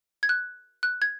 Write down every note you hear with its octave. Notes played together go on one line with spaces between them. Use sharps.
G#6
F#6
F#6
G#6